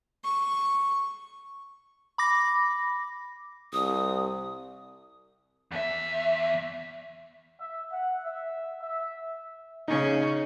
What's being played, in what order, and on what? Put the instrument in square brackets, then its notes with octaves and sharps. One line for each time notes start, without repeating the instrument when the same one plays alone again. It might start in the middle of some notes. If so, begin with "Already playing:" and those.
[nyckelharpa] C#6
[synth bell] B5 D6 A#6
[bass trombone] C2 [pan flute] D#6
[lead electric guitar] E2 E5
[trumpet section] E5
F#5
E5
E5
[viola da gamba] C#3 C#4 [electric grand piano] D#4